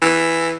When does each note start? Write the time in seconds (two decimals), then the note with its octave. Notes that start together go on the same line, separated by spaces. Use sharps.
0.02 E3